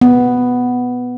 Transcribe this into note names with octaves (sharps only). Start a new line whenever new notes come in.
B3